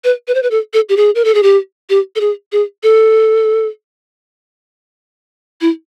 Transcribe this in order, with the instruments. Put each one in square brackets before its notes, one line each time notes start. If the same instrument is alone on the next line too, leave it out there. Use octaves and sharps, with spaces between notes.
[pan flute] B4
B4
C5
B4
A4
A4
G4
G#4
A#4
A4
G#4
G4
G4
A4
G#4
G#4
A4
E4